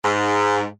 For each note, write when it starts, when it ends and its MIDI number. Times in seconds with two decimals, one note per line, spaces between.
0.05 0.66 44